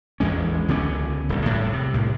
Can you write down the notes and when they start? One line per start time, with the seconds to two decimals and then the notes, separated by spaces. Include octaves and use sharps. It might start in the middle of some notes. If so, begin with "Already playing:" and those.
0.20 A1 E2 G#3 C#4
0.68 C#2 D3 B3 C#4
1.29 D#1 C2
1.46 A2 G3
1.73 C3
1.94 C2 A2